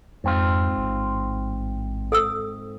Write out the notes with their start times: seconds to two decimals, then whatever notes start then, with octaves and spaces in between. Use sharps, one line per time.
0.24 F2 G#2 C4 F4
0.78 A1
2.12 A4 D#6 E6